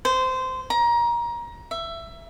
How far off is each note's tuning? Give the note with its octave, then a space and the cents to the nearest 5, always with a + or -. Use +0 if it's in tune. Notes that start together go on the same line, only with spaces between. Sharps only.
C5 -20
A#5 +25
E5 +15